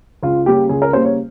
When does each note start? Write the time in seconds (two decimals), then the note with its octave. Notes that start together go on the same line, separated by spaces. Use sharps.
0.23 C#2 F4
0.46 C#3 G3 A#3 G4
0.69 C#2 G#4
0.82 A#4
0.93 C#3 G3 A#3 C5
1.05 C#5